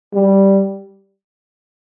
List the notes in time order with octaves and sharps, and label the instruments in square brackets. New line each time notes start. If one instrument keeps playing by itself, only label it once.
[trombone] G3